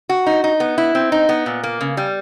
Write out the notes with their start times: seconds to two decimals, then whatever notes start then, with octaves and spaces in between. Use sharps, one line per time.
0.09 F#4
0.26 D#4
0.44 D#4
0.60 B3
0.78 E4
0.95 C4
1.12 D#4
1.29 B3
1.46 A#2
1.63 A#3
1.81 C#3
1.97 G3